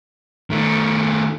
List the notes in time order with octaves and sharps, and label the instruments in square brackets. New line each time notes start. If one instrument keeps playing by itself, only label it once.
[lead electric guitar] D#3 A3